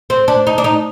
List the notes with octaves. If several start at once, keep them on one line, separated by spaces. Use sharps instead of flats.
C4
D4
D#4
D4
D#4